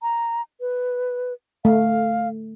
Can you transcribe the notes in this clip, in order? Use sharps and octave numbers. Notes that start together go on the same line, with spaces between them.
A#5
B4
A3 F5